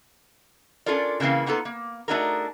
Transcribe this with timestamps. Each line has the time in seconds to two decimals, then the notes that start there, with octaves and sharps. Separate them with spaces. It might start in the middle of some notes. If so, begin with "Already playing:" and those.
0.86 C#4 D4 F4 A4 A#4 D5
1.20 C#3 E3 A#3 C4 F5
1.46 A#3 B3 D#4 F4 A4
1.65 A#3
2.08 A3 D4 D#4 F#4 G#4 A#4